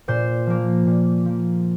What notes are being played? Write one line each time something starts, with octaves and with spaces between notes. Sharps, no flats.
A#2 C5
F3 A#3
A#2
F3 A#3